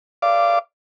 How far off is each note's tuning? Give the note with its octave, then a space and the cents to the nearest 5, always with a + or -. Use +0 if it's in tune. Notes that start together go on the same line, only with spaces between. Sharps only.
D5 -10 F5 -25 D6 +0